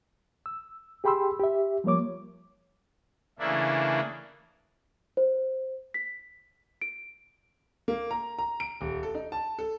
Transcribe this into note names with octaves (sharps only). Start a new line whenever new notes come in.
E6
G4 G#4 G5 B5 C6 E6
G4 E5
F3 G3 A#3 C#5 D6
C#3 E3 A3 A#3 D4 E4
C5
B6
D7
A#3
A#5
A#5
D7
D#1
A4
D#4
A5
A4